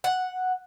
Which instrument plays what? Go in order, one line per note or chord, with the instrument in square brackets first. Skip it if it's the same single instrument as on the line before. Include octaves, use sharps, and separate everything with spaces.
[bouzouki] F#5